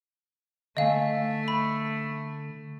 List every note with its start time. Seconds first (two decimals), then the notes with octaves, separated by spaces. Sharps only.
0.77 D3 A3 D#5 F5 G#5
1.48 B5